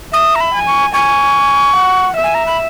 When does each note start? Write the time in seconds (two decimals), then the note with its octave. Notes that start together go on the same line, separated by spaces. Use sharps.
0.13 E5 D#6
0.35 A#5
0.41 B5
0.54 G#5
0.67 C#6
0.94 G#5 C#6
1.75 F#5
2.16 E5
2.24 G#5
2.35 A#5
2.47 B5